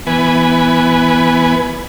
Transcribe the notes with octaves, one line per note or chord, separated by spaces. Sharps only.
E3 B3 B4 G#5